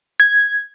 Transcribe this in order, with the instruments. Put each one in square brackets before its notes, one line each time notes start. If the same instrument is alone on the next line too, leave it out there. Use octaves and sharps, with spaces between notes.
[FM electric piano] G#6